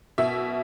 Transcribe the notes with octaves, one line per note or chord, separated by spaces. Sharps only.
B2 E5